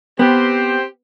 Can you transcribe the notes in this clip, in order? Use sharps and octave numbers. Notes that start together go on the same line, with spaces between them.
B3 C4 G4 C5